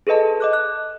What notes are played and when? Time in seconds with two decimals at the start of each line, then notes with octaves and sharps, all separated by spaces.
0.07 G#4 A4 B4 D#5 A5
0.40 D#5 D6 F#6
0.53 F#6